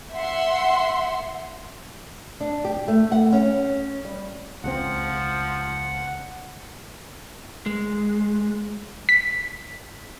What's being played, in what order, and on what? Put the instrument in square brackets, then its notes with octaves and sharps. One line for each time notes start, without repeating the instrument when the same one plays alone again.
[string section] E5 F#5 C6
[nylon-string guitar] D4
G4
A3
F#5
C#4
G3
[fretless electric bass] C#2 G3 C4 [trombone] F3 [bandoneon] F#5
[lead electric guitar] G#3
[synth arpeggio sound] B6